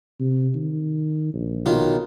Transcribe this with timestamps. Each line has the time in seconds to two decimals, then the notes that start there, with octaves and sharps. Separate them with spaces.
0.20 C3
0.55 D#3
1.34 A#1
1.66 B1 D#3 F4